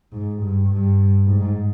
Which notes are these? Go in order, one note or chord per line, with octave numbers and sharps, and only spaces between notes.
G#2
G2
G2
G#2